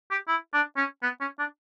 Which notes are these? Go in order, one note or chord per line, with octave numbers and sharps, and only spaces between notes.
G4
E4
D4
C#4
B3
C#4
D4